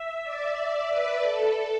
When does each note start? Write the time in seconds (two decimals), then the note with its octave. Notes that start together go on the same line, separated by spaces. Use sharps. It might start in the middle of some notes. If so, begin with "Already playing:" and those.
Already playing: E5
0.23 D5
0.90 B4
1.22 A4